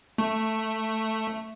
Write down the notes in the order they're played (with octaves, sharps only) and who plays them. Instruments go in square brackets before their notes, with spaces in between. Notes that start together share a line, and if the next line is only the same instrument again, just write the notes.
[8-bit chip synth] A3